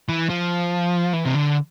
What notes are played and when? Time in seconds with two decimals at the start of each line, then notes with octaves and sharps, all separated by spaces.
0.09 E3
0.29 F3
1.13 E3
1.25 C3
1.34 D3